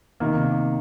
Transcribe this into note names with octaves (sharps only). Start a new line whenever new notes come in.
C3 D#3 A#3